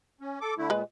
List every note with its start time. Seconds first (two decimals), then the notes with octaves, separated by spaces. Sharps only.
0.21 C#4
0.41 A4 D6
0.58 D3 A3 E4
0.70 A#2 G#3 B4